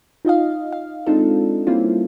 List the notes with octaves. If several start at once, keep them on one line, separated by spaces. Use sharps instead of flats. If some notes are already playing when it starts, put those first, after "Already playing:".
D#4 F4 D#5 F5
F5
G#3 C4 D4 D#4 F4 A4
G3 A#3 C4 C#4 E4 F4